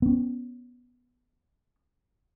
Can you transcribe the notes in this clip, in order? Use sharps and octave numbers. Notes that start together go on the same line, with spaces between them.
B3 C#4